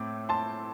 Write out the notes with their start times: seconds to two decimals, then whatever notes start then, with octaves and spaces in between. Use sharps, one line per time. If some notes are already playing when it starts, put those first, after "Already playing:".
Already playing: A2 A3 C4 D6
0.29 A5 C6